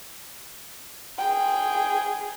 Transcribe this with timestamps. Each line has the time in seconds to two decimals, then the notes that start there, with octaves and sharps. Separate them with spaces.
1.19 G#4 G5